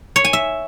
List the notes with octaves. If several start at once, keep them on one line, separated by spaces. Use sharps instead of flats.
C#5
G#5
E5